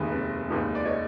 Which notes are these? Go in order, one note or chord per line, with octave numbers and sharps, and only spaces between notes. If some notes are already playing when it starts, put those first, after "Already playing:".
Already playing: F1 D#2 D#3 G#3 B3
F1
D#2 D#3 G#3 B3
D5
C#5 D#5